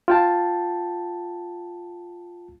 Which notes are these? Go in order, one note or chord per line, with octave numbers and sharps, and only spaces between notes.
F4 G5 A5